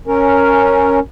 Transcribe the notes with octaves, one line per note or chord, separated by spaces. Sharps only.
C#4 A#4